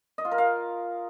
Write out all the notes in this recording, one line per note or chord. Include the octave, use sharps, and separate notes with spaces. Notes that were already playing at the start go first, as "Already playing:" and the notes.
D#5
F4
A#4
F5